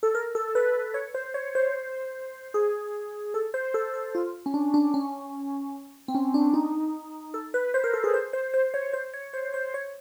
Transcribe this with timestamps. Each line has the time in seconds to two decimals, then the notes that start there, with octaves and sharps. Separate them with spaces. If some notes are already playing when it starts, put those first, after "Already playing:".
0.03 A4
0.15 A#4
0.35 A4
0.55 B4
0.94 C#5
1.14 C5
1.34 C#5
1.55 C5
2.54 G#4
3.34 A4
3.54 C5
3.74 A4
3.94 A4
4.15 F4
4.46 C#4
4.54 D4
4.74 D4
4.94 C#4
6.08 C4
6.15 C#4
6.34 D4
6.54 D#4
7.34 A4
7.54 B4
7.74 C5
7.84 A#4
7.94 A4
8.04 G#4
8.14 C5
8.33 C5
8.54 C5
8.74 C#5
8.93 C5
9.14 C#5
9.33 C5
9.54 C5
9.74 C#5